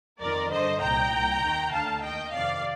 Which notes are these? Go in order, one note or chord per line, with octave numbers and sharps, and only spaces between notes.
F2 D#3 A#4 D5
G2 D3 C5 D#5
C2 A#2 G5 A#5
C2 A#2
D#2 D#3
D2 D3 F5 A5
D#2 D#3 D#5 G5
F2 C3 D#3 D5 F5